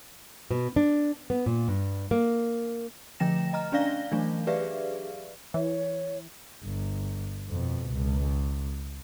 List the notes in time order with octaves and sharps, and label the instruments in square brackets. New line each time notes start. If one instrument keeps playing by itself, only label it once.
[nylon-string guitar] B2
D4
B3
A#2
G2
A#3
[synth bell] D3 F3 A3 G5 A#6 E7
D#5 A#5 F6
C#4 D4 D5 F5 A#6 G7
E3 F#3 A3 D4
G4 G#4 B4 D5 E5 F5
[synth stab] E3 [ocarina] C#5
[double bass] G1
F2 B2
C#2